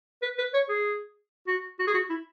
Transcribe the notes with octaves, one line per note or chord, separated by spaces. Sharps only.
B4
B4
C#5
G#4
F#4
F#4
G#4
F#4
E4